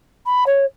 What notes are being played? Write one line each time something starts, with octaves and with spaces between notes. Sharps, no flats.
B5
C#5